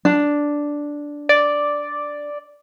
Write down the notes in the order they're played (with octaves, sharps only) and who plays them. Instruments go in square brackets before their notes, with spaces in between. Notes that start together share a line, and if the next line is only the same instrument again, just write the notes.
[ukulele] D4
[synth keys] D5